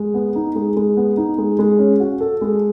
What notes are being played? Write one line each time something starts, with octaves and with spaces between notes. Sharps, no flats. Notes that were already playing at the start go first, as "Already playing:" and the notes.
Already playing: G#3
B3
D#4
G#3
G#3
B3
D#4
G#3
G#3
C#4
F#4
A4
G#3